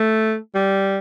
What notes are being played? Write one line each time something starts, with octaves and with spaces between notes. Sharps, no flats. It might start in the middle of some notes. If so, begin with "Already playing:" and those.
Already playing: A3
G3